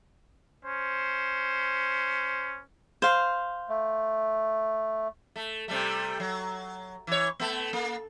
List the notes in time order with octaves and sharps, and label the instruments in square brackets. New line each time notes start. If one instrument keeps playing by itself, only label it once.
[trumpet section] C#4 C5
[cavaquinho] C5 F5
[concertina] A3
[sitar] A3
C3 G3 A3
F#3
E3 C#5
A3 B3
A#3